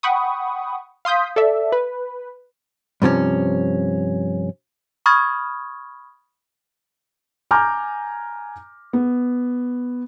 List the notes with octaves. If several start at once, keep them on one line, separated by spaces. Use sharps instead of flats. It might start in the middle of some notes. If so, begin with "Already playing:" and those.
F#5 G5 B5 C#6 D#6
F5 C6 D#6 G6 B6
A4 D5 E5
B4
G2 C3 F3 C#4
B5 C#6 D#6 F6 G#6 A6
G#5 A#5 D6 F6 G6
B3